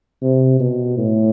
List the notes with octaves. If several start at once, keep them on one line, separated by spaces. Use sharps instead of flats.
C3
B2
A2